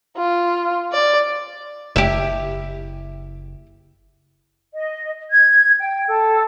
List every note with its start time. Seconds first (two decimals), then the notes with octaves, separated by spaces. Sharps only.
0.17 F4
0.92 D5
1.96 F#1 E4 G4
4.74 D#5
5.31 G#6
5.79 G5
6.07 A4